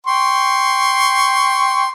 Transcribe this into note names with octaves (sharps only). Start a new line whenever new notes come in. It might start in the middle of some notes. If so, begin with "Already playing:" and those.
G5 C6 C#6